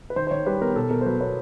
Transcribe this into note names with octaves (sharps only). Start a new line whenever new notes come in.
B4
D#3 C5
C5
D#3 C#5
G3 B4
B3 A#4
B2 A4
B2 A#4
C5
F#3 B4
B3 C#5